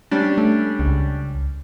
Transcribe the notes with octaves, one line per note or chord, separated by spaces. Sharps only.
G3 C#4 D4
A3
C#2